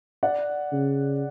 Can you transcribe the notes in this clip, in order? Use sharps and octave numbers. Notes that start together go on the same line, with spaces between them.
D5 F#5
C#3